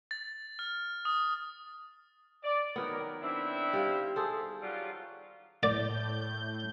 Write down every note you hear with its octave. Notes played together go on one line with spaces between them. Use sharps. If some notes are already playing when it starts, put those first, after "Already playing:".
A6
F6
D#6
D5
D#3 F#3 B3 A#4
C4 D4 E4
G3 F5
G#4 A4 C5
F#3 G3 F4
A2 D5 G6